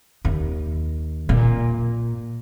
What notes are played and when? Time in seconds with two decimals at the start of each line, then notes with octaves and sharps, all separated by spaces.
0.25 D#2
1.29 A#2